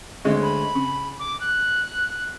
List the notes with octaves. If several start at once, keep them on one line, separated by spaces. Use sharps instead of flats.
D2 G#3 C#4
B5
C#3
D6
F#6